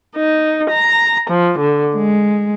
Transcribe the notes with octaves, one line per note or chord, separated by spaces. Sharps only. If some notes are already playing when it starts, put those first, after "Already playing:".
D#4
A#5
F3
D3
G#3